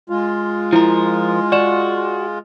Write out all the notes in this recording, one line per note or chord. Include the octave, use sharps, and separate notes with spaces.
G#3 F4
F3 E4 A#4
F#4 D5 E7